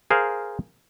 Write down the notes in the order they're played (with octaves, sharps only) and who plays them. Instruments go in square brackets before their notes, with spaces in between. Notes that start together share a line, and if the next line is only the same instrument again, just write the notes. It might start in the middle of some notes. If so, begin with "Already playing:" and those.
[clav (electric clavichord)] G#4 A#4 C5 F5